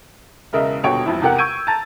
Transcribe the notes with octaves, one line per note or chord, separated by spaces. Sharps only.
E1 C#3 A#4 D#5 E5
D#1 B2 D3 G4 C#5 D7
E1 F2 E4
E2 C3 G4 A#4 F#5
C#6 E6 G6 G#6 D7 D#7
A5 A#5 A6